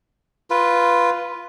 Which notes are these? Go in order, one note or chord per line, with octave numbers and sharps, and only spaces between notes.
F4 B4